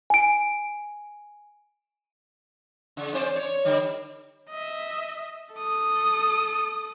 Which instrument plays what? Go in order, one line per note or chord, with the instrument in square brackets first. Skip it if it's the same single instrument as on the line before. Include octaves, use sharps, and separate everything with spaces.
[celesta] G#5 D7
[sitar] C#3
C4 C5 D5
C#5
D3 G3
[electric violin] D#5 E5
A4 D#6